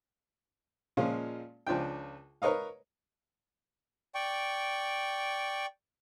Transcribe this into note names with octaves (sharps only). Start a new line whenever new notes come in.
A#2 F3 G#3 C#4 F4
C#2 F3 D4 G5
A#4 B4 C#5 D#5 F5
D5 G5 C#6